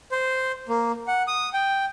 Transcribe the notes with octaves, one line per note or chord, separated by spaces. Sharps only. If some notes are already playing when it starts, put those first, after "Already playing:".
C5
A#3
F#5
D#6
G5